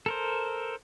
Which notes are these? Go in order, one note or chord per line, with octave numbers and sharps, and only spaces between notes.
A4 A#4 C5